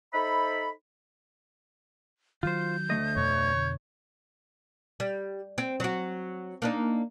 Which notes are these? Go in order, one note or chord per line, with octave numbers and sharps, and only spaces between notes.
D#4 A4 C5 E5 B5
D#3 F#3 F4 C5 G6
D2 A3 D#5
F2 B2 D3 C#5
G3
C4
F#3 F#4
A#3 D4 D#4